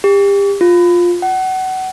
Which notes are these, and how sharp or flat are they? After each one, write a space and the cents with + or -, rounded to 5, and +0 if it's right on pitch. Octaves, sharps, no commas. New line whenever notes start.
G4 +30
F4 +10
F#5 +25